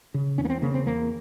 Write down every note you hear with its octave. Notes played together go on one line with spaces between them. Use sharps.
C#3
E2 C#4
A#3
C4
C#3 A#3
C4
E2 A#3